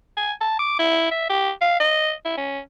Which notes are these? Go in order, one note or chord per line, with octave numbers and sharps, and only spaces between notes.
G#5
A5
D6
E4
E5
G4
F5
D#5
E4
C#4